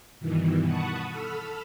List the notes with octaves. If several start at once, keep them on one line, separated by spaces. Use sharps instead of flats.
G2 B2 D#3 E3
F#5 A5 B5 C#6 D#6 F#6
A4 B5 E6 F6